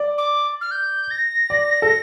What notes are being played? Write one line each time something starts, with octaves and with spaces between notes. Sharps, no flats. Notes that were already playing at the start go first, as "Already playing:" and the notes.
Already playing: D5
D6
F6
G6
A#6
D5
A4